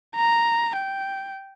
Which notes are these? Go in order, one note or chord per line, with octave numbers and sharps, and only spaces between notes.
A#5
G5